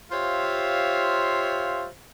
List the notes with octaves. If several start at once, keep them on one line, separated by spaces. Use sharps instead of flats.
F4 G4 C5 C#5 E5 F5